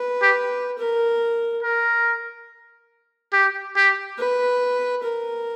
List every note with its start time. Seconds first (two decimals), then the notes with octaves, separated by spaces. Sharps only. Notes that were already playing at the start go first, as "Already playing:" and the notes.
Already playing: B4
0.22 G4
0.78 A#4
1.63 A#4
3.33 G4
3.76 G4
4.18 B4
5.04 A#4